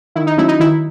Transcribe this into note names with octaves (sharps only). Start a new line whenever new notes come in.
D#3 E4
D#4
F#3 A3 C#4 E4
D#4
D#3 E4